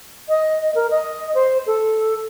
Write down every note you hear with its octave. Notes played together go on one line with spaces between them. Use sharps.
D#5
A#4
D#5
C5
A4